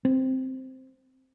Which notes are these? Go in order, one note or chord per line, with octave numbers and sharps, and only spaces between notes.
C4